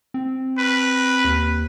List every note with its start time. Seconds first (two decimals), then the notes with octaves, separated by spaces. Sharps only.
0.14 C4
0.58 B4
1.24 D#2